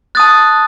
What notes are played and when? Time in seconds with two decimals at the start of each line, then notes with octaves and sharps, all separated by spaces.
0.15 A5 D#6 F#6 A6